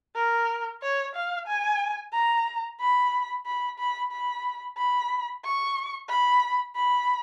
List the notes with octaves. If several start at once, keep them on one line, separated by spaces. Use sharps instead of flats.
A#4
C#5
F5
G#5
A#5
B5
B5
B5
B5
B5
C#6
B5
B5